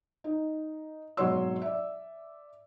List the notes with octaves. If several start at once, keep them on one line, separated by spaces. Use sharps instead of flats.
D#4
G#1 B2 F#3 C#5 C6 E6
D5 E5